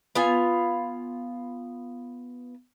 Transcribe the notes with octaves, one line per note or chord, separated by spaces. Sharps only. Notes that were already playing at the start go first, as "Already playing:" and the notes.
B3 F4 G#5